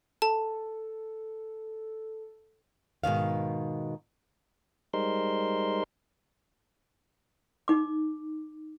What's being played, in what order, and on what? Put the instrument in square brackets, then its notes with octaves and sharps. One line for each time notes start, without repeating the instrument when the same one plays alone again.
[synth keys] A4 [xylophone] A5
[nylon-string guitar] G#2 B2 D#3 F5
[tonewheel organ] G3 G#3 D#4 A#4 C5 C6
[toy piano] D#4 D6